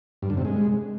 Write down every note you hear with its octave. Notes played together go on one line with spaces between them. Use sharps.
G2
D3
C3
G#3